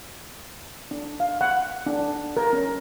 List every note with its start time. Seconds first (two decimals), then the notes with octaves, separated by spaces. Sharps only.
0.91 D4
1.20 F5
1.41 F#5
1.86 D4
2.37 A#4
2.53 C#4